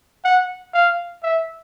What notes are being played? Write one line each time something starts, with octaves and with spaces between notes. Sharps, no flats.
F#5
F5
E5